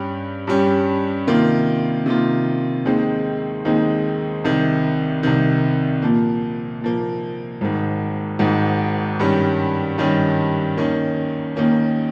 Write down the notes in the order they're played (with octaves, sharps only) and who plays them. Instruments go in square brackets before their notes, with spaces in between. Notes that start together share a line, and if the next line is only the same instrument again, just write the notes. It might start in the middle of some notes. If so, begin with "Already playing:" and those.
Already playing: [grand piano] G2 G3 C#4 G4
G2 G3 C#4 G4
C3 D#3 A#3 F4
C3 D#3 A#3 F4
D#2 D#3 G#3 C4 D#4
D#2 D#3 G#3 C4 D#4
C2 C3 D#3
C2 C3 D#3
A#2 F3 A#3
A#2 F3 A#3
G#1 G#2 D#3
G#1 G#2 D#3
G2 D#3 G3 C#4
G2 D#3 G3 C#4
D#2 D#3 A#3 C#4
D#2 D#3 A#3 C#4